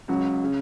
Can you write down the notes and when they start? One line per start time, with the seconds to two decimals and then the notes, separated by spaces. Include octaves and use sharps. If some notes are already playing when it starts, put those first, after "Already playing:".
0.08 C#2 C#3 F#3
0.44 C#3